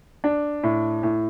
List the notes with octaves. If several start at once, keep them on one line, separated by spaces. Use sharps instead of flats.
D4
A2
A2